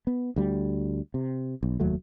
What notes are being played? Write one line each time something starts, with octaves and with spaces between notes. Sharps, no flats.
B3
D2 G3
C3
B1
F1 D#2 F#3 A3